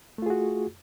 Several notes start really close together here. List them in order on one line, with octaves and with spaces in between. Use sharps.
A3 F4 G#4 F#4